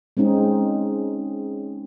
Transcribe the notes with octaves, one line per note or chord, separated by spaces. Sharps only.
G#3 C4 C#4 D#4 G#4